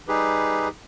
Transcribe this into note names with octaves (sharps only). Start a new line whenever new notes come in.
G3 D#4 G4 G#4 B4